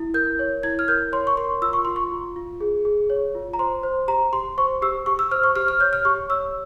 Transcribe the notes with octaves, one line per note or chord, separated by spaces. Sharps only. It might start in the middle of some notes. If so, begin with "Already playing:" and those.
Already playing: E4
A#4 G6
C#5
E4 G#6
F6
A#4 G6
C#5 C6
C#6
A#4 C6
F4 E6
C#6
F4 C6
C#6
F4
F4
G#4
G#4
C#5
F4
A#5
C5 C6
C5
G4 A#5
G4 C6
C5 C#6
G4 E6
G4 C#6
E6
C5 F6
C#6
G4 F6
F6
C#5 G6
F6
G4 C#6
C#5 E6